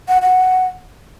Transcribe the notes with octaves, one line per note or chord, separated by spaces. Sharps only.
F#5
F#5